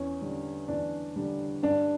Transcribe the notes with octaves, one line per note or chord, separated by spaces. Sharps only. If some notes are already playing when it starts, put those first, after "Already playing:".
Already playing: E2 C#4
D3 G3
E2 D4
D3 G3
G2 D4